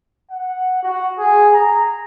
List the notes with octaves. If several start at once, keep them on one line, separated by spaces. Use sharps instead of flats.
F#5
F#4
G#4
A#5